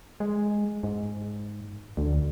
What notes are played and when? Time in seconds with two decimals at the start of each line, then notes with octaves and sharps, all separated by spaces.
0.20 G#3
0.83 G#2
1.97 D2